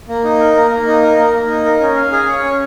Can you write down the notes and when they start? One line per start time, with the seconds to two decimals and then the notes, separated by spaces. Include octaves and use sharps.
0.08 A#3
0.24 D#4
0.39 A#4
0.56 A#3
0.71 A#3
0.87 D#4
1.02 A#4
1.18 A#3
1.33 A#3
1.50 D#4
1.65 A#4
1.81 C#4
1.96 F5
2.12 G#4
2.28 C#5
2.43 C#4